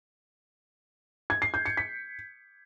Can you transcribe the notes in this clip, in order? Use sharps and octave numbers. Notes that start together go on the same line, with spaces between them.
G#6
C7
G6
C#7
B6